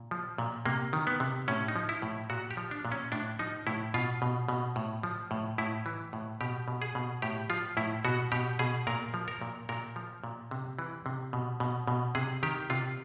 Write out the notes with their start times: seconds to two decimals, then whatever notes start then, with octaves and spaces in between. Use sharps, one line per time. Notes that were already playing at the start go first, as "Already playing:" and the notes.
Already playing: A#2
0.11 F3
0.38 A#2
0.65 C3 A#3
0.93 D#3
1.07 B3
1.20 C3
1.48 A2 C#4
1.68 D#4
1.76 F3
1.89 E4
2.02 A2
2.30 A#2 F#4
2.51 G4
2.57 F3
2.71 D4
2.85 A#2
2.92 C#4
3.12 A2 D4
3.39 F3 D#4
3.67 A2 E4
3.94 B2 F4
4.22 B2
4.49 B2
4.76 A2
5.03 F3
5.31 A2
5.58 A2 E4
5.86 E3
6.13 A2
6.41 B2 G4
6.68 B2
6.82 G#4
6.95 B2
7.22 A2 G4
7.50 F3 F4
7.77 A2 E4
8.05 B2 F#4
8.32 B2 G4
8.59 B2 G#4
8.87 A#2 A#4
9.14 F3
9.28 A#4
9.42 A#2
9.69 A#2 A#4
9.96 F3
10.24 A#2
10.51 C3
10.79 E3
11.06 C3
11.33 B2
11.60 B2
11.88 B2
12.15 C3 G#4
12.43 D#3 G4
12.70 C3 F4